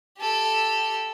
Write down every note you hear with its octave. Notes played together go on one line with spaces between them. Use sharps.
G4 A4